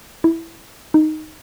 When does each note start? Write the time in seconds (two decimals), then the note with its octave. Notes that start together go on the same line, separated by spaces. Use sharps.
0.24 E4
0.94 D#4